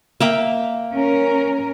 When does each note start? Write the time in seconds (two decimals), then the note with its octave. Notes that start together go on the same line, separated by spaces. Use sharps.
0.20 A#3 E5 G5
0.93 C#4 A#4